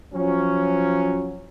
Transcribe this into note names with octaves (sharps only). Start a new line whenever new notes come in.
F3 F#3 C#4